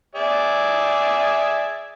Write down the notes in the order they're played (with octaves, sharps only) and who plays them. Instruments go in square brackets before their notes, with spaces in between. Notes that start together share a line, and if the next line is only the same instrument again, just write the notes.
[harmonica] G#4 D5 E5